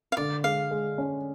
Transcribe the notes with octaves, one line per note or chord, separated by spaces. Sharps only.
F5
D3 D5
G#3 F5
G#3
C#4